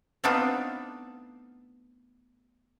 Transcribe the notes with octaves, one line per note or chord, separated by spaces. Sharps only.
A3 B3 C4 D4 D#4 F4